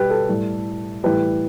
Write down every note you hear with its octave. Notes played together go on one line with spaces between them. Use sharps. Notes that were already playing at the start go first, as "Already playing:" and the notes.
Already playing: B2 G3 G4 B4
A4
A2 G3
A2 E3 G3 G4 B4